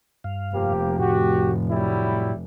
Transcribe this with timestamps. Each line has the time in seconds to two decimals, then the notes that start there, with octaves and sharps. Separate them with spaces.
0.24 G2 F5
0.53 F1 F3 A#3 G4
0.99 A2 F#4 G4
1.70 F#3 G3 E4